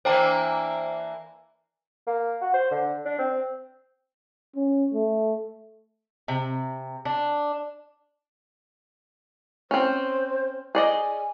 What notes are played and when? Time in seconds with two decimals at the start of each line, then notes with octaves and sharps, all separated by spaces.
0.05 E3 A#3 D4 C5 G5 A#5
2.07 A#3
2.41 F#4
2.54 C5
2.71 D3
3.05 D4
3.18 C4
4.56 C#4
4.94 A3
6.28 C3
7.05 D4
9.71 C4 C#4 C5
10.75 G#4 D5 D#5 G#5